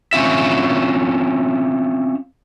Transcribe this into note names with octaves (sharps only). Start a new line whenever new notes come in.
C4 C#4 F4 E5